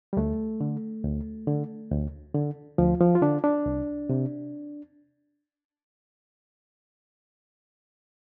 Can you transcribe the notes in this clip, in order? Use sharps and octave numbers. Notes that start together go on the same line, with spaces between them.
G3
D2 A3
D3
D2
D3
D2
D3
D2 F3
F3
F4
D3 D4
D4
C2
C3